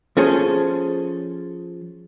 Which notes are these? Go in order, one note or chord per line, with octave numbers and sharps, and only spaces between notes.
F3 C#4 G#4 A4 C5